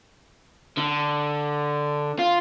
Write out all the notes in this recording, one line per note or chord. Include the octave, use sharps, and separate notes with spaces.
D3
F4